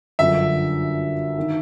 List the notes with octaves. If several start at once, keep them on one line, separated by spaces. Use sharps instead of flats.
G1 F#2 D3 F3 E5
D#3